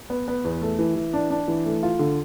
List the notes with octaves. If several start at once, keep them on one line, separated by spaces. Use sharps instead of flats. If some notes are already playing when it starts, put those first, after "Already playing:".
B3
B3
E2
A3
E3
E3
D4
D4
E3
A3
F4
D3